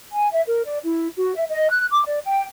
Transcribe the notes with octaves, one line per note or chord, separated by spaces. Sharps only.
G#5
E5
A#4
D5
E4
F#4
E5
D#5
F#6
D6
D5
G5